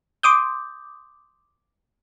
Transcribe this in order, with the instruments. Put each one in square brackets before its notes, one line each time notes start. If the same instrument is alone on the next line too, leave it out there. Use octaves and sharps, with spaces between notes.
[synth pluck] C6 D6 D#6 G6